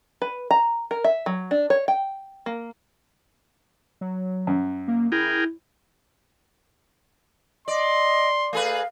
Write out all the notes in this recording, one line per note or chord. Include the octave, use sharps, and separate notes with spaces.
B4
A#5
A#4
E5
F#3
D4
C#5
G5
A#3
F#3
F#2
A#3
E4 G#4 A#4 G5
D5 D#5 C6
A3 G#4 B4 F5